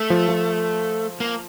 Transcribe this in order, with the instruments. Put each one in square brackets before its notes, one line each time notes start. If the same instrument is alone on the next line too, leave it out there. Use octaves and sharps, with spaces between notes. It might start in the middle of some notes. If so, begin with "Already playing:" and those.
Already playing: [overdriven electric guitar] A3
[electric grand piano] F3
F3
[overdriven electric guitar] A#3